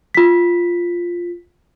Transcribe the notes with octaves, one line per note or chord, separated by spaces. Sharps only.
F4 B6